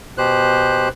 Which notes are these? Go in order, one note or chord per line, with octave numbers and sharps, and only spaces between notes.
B2 G4 C5 F#6